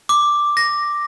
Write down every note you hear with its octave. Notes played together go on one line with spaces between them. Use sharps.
D6
A#6